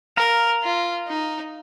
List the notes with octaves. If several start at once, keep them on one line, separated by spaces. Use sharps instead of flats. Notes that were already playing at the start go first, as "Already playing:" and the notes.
A#4 F5 A#5
F4
D#4